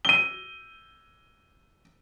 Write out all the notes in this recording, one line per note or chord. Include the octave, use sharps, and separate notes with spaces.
D#7 G7